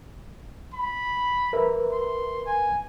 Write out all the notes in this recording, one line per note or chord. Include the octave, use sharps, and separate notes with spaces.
B5
A#4 B4 E5
C6
G#5